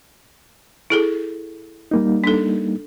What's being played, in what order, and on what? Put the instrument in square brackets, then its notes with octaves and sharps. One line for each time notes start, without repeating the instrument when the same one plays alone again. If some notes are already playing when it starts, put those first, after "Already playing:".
[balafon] E4 G#4 A4
[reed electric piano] G3 A#3 D#4
[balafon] D4 A4